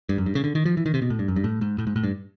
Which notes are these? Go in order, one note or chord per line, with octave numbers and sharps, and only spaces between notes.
G2
F#2
G2
C#3
D3
D#3
F3
E3
D#3
C3
B2
A2
G2
F#2
G2
A2
G#2
A2
G#2
A2
G2